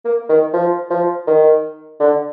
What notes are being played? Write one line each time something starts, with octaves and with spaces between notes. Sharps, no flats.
A#3
D#3
F3
F3
D#3
D3